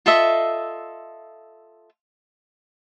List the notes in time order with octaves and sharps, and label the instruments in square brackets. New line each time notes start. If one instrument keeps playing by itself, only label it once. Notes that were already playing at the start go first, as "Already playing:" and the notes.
[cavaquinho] F4 A4 D#5 E5